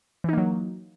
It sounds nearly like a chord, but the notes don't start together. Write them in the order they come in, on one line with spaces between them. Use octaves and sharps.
E3 D#4 A#3 F#3